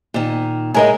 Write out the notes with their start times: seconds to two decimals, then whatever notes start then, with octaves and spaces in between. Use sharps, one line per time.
0.14 A#2 D#3
0.74 A2 G#3 G#4 A#4 D#5